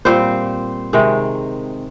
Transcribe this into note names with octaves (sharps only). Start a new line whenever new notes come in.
A#2 G3 C4 C5
C3 D#3 G#3